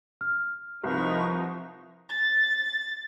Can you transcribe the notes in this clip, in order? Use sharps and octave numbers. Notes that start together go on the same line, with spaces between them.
F6
C2 F3 D#4 A#4 B4 C#6
A6